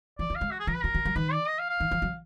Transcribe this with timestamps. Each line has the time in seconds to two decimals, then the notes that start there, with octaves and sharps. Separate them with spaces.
0.19 F3 D5
0.30 F#3
0.36 F5
0.41 G#3
0.51 F#4
0.60 G#4
0.67 F3 A#4
0.76 B4
0.84 F#3 A#4
0.95 F#3
1.05 F#3
1.16 D#3 B4
1.32 D5
1.48 D#5
1.59 F5
1.70 F5
1.80 D#3
1.91 F3
2.02 F#3